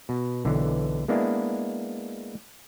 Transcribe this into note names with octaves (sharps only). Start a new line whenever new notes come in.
B2
B1 D3 E3
G#3 A#3 B3 D4 E4 G#4